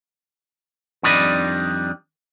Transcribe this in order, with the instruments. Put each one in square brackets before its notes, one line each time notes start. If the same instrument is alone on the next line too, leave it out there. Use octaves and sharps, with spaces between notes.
[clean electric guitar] F2 D#3 G3 D4 D#5 B5